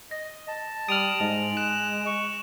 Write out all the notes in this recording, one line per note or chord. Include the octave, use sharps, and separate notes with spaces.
D#5 A#6
A5
G3 D#6 F6 D7 F7 F#7
G#2 G#3 D#5
F#6 E7
C#6